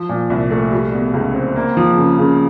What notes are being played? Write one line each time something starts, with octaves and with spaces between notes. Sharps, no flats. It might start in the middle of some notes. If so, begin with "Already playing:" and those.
Already playing: F3
A#2
C2
A3
G3
B2
C#2
C4
A#3
F3
C#3
C#3